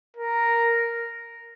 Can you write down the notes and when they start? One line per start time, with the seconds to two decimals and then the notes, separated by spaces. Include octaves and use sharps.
0.17 A#4